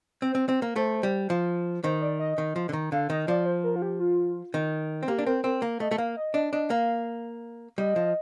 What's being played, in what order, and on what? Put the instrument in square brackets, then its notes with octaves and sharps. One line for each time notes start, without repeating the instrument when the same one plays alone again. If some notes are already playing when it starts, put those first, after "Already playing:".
[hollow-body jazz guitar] C4 [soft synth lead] C5
[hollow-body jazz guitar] C4
C4
A#3
[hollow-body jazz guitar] A3 [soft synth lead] C5
[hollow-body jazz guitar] G3
F3
[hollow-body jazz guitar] D#3 [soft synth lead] C5
[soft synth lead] D5
D#5
[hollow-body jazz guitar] D#3
F3
D3
D#3
[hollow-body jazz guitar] D3 [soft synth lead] F5
[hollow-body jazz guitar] D#3 [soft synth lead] D#5
[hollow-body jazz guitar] F3 [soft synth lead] D5
[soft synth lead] C5
A#4
F4
G4
F4
[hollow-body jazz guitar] D#3
C4
[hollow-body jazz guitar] A#3 [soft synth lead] G4
[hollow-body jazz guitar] D4
[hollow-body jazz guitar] C4 [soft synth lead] A#4
[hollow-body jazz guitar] C4 [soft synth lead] A#4
[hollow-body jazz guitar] A#3
[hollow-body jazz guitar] A3 [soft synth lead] D#5
[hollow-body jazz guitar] A3
[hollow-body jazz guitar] A#3 [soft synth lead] F5
[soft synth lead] D#5
[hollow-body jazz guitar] D4 [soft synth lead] D#5
[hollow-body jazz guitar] D4 [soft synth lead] D#5
[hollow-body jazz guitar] A#3 [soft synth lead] F5
[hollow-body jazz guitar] G3 [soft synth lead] D#5
[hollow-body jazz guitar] F3